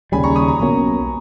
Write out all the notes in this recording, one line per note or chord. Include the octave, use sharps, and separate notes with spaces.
D#2 C#3 G3 G#5 B5
A#5 C#6
B5 D#6
A#5 C#6
B1 B2 A#3 C#4